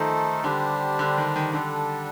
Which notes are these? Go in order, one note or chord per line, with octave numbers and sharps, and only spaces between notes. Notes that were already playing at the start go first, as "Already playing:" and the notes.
Already playing: D#3 F3 A3 D#4 A4 C5
D3 G3 D4 G4 C5
D3
D#3
D#3
D3 G3 D4 A4